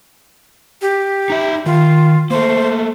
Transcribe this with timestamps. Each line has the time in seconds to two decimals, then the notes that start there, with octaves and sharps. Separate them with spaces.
0.82 G4
1.30 D#4 E5
1.66 D#3 F4
2.30 A3 A#3 C5